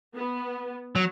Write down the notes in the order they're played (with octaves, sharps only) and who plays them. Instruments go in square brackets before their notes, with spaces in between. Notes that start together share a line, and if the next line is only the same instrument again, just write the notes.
[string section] B3
[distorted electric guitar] F#3